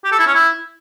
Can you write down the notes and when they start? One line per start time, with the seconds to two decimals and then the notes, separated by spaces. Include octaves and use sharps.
0.05 G4
0.12 A4
0.19 E4
0.27 C#4
0.34 E4